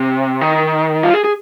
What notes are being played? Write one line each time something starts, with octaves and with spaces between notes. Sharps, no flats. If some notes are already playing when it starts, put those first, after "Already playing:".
Already playing: C3
D#3
F4
G#4
G#4